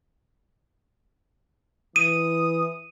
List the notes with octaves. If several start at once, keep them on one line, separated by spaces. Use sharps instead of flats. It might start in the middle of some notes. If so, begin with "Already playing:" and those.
E3 D#6 D#7